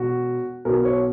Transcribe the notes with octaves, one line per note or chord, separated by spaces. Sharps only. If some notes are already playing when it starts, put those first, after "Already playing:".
Already playing: E1 F#4
B1 B2 A#4
C#5